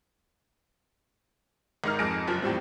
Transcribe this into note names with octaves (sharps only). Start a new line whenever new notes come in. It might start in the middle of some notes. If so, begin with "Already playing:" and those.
G#1 G#3 D#4 A#4 F6
F2 G#2 G#4 A#6 D7
F#1 F#2 F3
E2 A2 G3 C4